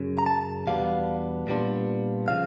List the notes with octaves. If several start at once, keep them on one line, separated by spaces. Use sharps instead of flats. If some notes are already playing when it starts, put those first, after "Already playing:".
Already playing: F#2 C#3
A#5
A5
E2 B2 G3 B3 D4 F5
A#2 G3 B3 D4 F4
C#3 F3 F5